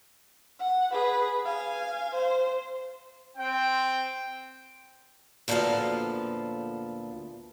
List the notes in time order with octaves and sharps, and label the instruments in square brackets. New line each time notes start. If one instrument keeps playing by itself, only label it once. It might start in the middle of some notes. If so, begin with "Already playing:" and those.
[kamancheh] F#5
G#4 B4
F5 G#5
C5
[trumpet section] C4 G5
[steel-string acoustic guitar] D2 A#2 F3 B3 A4 F5